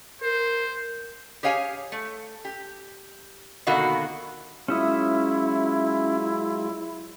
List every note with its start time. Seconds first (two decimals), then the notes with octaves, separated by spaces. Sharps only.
0.22 A#4 C5
1.43 G4 G#4 C#5 F5 G#5
1.92 A3
2.45 G4
3.67 B2 D3 D#3 A#3 F#4
4.68 F#3 G#3 C#4 E4 F4 E5 D#6